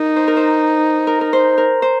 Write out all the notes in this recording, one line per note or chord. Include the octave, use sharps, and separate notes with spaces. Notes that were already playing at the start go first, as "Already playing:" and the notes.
Already playing: D#4 A#4
C5
A#4
C5
A#4
A#4
C5
A#4
C5